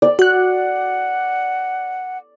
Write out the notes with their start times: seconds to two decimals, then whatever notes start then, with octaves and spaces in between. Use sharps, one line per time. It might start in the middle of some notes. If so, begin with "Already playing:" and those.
0.02 D5
0.19 F#4 F#5 F#6